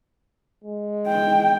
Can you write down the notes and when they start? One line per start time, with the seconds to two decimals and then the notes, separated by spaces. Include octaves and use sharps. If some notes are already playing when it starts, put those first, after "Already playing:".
0.64 G#3
1.08 G5